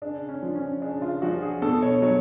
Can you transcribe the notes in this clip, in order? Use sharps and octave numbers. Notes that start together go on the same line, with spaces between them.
C#3 D4
C#4
F3
C#4
C#3 D4
F4
F3 F#4
G#4
B2 A4
C#5
F#3 C#5